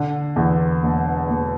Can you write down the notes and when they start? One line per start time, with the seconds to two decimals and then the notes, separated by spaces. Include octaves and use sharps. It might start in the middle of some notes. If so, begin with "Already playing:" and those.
Already playing: D3
0.36 E2
0.83 E1
1.29 E1